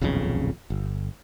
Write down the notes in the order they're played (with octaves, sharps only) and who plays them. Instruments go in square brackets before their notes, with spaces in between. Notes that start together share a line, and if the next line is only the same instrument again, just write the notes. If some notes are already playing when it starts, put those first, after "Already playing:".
[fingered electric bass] D#1 B1 F2 C#3
G1